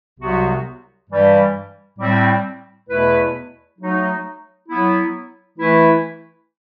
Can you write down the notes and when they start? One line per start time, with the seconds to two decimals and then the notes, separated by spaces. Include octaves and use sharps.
0.18 C2 C3 F#3 B3 F#4
1.09 G2 E3 G3
1.98 A2 G3 C4
2.89 E2 B2 A3 E4 B4
3.78 F#3 A3 D#4 F#4
4.68 F#3 B3 E4
5.58 E3 A3 E4 B4